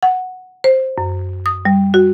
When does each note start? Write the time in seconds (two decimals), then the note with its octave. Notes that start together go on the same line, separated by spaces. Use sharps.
0.03 F#5
0.64 C5
0.98 F#2
1.46 D#6
1.65 G3
1.94 F#4